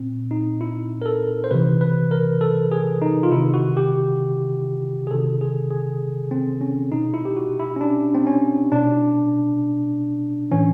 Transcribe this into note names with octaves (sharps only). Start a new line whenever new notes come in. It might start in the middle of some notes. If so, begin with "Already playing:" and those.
Already playing: A#2 C4
D#4
E4
A#4
A4
C5
C3 E3 B4
B4
A#4
A4
G#4
D#4
F4
C3 D#3 E4
F#4
G4
G#4
C3 D#3 A4
G#4
G#4
C4
C#4
B2 D#4
E4
G4
F#4
E4
C#4
D4
C4
C#4
B2 D4
A2 E3 C#4